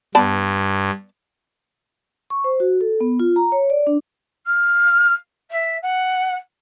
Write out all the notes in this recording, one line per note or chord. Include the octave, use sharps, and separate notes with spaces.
G2 B3 D5 A5
C#6
C5
F#4
A4
B3
F4
A#5
C#5
D5
D4
F6
E5
F#5